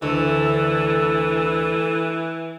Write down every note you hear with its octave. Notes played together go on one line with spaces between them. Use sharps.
D2 E3 A4